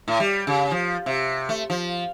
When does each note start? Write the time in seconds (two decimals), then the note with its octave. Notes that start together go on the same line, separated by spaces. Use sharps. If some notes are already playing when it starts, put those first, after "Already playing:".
0.08 A2
0.20 G3
0.47 C#3
0.71 F3
1.06 C3
1.49 A3
1.70 F3